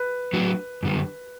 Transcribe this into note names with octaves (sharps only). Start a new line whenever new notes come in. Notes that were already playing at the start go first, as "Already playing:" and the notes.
Already playing: B4
F#3 A3 D4 F#4
F#2 D3 G3